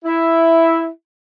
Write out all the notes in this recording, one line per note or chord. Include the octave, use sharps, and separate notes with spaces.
E4